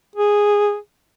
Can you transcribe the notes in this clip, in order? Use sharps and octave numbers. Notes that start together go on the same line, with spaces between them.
G#4